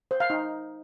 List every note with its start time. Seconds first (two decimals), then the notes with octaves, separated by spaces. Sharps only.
0.11 C5
0.20 F5
0.30 D#4